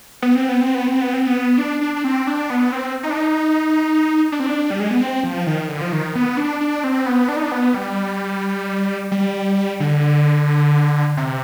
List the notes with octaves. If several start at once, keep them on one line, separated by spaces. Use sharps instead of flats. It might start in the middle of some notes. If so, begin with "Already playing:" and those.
B3
C4
B3
C4
B3
C4
B3
C4
B3
D4
D4
D4
C4
D4
B3
C4
D#4
D4
D#4
D4
C4
D4
G3
G#3
B3
C4
F3
D#3
D3
F3
D#3
B3
D4
D4
C4
B3
D4
D#4
D4
B3
G3
G3
D3
C3